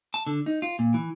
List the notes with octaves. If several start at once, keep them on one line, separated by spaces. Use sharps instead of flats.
A5
D3
D#4
F4
A#2
E3